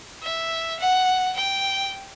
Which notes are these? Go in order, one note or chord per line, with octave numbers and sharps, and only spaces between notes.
E5
F#5
G5